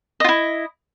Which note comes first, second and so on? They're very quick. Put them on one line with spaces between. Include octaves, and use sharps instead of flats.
D#5 F4 E4